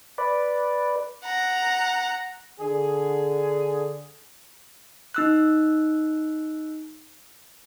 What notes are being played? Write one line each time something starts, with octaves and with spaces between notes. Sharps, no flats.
B4 D5
F#5 A#5
D3 G#4
D#4 E6 F#6